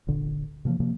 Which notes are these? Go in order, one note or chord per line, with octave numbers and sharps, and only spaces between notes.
D1 G1 A#2 D3
C3 E3 F3 A#3
C3 E3 F3 A#3